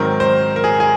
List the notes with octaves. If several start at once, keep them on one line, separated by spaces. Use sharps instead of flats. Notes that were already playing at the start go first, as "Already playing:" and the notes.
Already playing: G#2 D#3 F#3 C4 A#4
C5
A#4
G#4
G#4